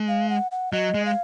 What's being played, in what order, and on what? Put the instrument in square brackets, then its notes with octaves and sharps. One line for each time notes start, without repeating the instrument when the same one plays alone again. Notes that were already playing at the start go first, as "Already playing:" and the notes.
Already playing: [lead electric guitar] G#3
[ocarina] F5
F#5
F#5
[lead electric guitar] F#3 [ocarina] D#5
[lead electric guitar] G#3
[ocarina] F5